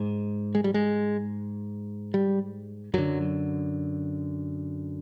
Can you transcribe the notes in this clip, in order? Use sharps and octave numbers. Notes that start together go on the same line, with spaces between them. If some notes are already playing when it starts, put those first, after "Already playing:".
Already playing: G#2
G#3
G3
G#3
G3
F#2 D3 F#3